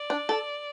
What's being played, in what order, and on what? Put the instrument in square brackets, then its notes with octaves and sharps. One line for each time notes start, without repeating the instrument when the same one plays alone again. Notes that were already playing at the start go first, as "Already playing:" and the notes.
Already playing: [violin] D5
[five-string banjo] D4
A4